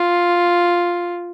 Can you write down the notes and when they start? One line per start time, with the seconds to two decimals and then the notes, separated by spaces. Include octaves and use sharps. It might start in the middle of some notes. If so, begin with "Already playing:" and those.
Already playing: F4